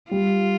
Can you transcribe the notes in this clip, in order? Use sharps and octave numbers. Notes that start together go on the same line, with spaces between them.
G3 F4